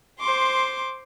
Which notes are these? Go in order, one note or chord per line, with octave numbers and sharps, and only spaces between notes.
C5 C6 D6